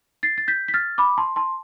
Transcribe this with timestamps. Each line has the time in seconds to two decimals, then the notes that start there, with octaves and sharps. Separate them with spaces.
0.23 A6 C7
0.38 A6
0.48 G6 B6
0.68 B6
0.74 F6 A6
0.98 B5 D6
1.18 A5 C6
1.36 A5 C6